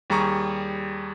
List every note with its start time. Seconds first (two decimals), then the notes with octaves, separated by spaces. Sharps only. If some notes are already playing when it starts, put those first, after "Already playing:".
0.10 D#2 G3 G#4 A#5 C#6